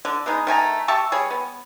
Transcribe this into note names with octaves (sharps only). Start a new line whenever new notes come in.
D3
G#3 B3 D#4 G#4
D#3 A3 G#5 A#5
G4 E5 A5 C#6
G3 G#4 C#5
B3